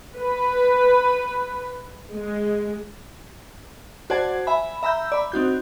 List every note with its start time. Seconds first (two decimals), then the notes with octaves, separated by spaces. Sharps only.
0.18 B4
2.13 G#3
4.10 F#4 C5 D5 F#5 A5 G#6
4.47 E5 G#5 B5
4.83 E5 A#5 B5 E6 G6
5.12 D5 B5
5.32 C4 D#4 F#4 G6